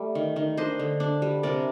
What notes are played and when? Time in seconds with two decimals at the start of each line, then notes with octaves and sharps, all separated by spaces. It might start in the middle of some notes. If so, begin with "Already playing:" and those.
Already playing: G3 A3
0.15 D#3
0.36 D#3
0.57 D4 C5 D#5
0.79 D3
1.00 D4
1.22 G3
1.43 C3 A#4 D5